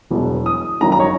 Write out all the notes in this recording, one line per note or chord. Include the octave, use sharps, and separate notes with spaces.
E1 E2 B2 F#3
D#6
G#1 F#2 D#3 F#3 A#5
A#5
C#5